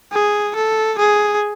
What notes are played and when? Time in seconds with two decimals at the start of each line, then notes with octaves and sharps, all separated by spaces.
0.12 G#4
0.56 A4
0.98 G#4